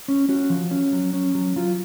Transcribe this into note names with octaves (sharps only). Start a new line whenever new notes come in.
C#4
C#4 F#4
F3
C#4
F#3
C#4
F#3
F#3 F4